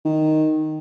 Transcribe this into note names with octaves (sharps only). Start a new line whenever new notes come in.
D#3